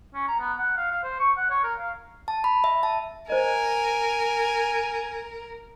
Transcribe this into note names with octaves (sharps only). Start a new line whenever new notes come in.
C#4
A#5
B3
F#5
F5
F5
C5
C#6
F#5
C#5
A#4
F5
A5
B5
E5
A5
A#4 C5 D#5 G#5